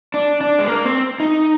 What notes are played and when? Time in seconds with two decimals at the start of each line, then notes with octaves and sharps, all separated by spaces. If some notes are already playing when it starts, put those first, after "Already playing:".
0.14 D4
0.41 D4
0.59 G#3
0.68 A#3
0.85 C4
1.20 D#4